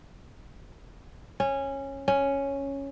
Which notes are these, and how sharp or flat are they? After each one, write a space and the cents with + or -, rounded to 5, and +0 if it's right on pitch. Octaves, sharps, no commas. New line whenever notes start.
C#4 -15
C#4 +0